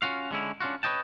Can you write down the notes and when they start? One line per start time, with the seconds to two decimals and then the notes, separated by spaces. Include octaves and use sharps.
0.02 C#4 F4 F#4 F5
0.31 D3 G#3 C#4 E4
0.60 C#4 D4 F4 F#4
0.83 B4 C#5 D#5 G5 A5